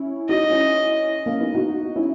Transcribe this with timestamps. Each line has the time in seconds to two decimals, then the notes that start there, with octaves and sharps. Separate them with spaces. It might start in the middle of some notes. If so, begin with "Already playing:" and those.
Already playing: C#4 E4
0.29 D#4 F#4 D#5
0.50 C#4 E4
1.26 A#3 C#4
1.40 B3 D#4
1.55 D#4 F#4
1.96 C#4 E4